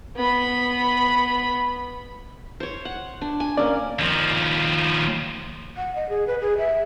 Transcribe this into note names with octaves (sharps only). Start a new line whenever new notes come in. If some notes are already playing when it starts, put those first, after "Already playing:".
B3 B5
C5 C#5
F#5
D4
G#5
A#3 C#4 D5
D#2 F3
F#5
D#5
G#4
B4
G#4
E5